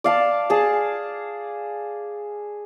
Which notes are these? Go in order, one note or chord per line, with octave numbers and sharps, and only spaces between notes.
D5 F5 A5
G#4 A5